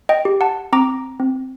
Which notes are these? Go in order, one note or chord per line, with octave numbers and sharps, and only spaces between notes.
D#5 G5
G4
F#5 A5
C4 A#5 D6
C4